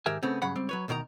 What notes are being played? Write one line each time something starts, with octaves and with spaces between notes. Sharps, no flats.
G#2 D#3 G4 A#4 E5 G#5
C#3 A3 B3 C4
G2 C#3 F#3 F#5 B5
C#2 G3 C4
F#3 B4 C#5
D2 B2 D#3 A#4 A#5